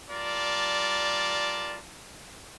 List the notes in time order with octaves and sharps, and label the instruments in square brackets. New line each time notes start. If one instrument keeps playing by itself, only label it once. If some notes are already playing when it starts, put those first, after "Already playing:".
[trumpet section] G3 F4 A#4 D5 A5